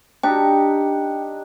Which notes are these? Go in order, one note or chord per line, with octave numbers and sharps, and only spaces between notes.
D4 D#4 G4 G5